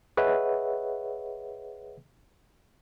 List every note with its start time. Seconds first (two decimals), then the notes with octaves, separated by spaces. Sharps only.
0.17 G#4 B4 C#5 D#5 E5 F#5